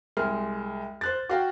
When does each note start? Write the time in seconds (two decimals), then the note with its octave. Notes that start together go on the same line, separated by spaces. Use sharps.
0.17 C2 G#3 F6
1.01 C5 F#6 A6
1.29 F#4 F5 G5